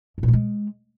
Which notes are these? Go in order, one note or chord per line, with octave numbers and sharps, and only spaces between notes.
G#2
A#2
G3
G#3